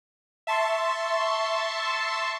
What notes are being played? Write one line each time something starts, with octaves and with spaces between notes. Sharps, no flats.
E5 A5 C6 C#6